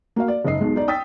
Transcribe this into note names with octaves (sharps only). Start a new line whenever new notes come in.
A#3 F#4 F5
D5
F#1 G#2 D#5 C7
B1 B2 G#3
D#4 D5
G5 D#6 E6 A6 B6